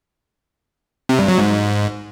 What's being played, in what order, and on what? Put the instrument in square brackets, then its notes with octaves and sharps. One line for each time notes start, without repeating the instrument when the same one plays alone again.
[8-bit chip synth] C3
G2
F#3
G#2